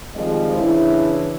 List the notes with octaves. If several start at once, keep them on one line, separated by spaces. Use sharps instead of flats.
D#3 F3 G3 G#3 C4 D#5
C#3 E3 D4 E4